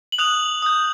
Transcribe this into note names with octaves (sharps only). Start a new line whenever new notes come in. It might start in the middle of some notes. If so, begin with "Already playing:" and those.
F#7
D#6 F#6 F7
D#6 G6